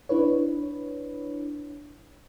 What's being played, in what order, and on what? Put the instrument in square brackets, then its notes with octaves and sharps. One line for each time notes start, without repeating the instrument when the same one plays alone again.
[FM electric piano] D4 E4 B4 C#5